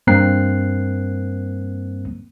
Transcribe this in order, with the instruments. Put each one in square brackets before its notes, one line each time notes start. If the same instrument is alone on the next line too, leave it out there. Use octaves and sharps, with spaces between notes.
[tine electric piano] G2 A#3 C4 A#5 F#6 C7